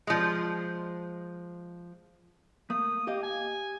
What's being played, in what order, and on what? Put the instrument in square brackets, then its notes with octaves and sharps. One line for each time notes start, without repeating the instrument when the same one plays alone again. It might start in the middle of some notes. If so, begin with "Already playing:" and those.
[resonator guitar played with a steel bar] F3 G#3
[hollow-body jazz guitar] A3 A#3 [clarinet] D#6
[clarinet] A#3 [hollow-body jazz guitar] G4 D#5
[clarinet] G#5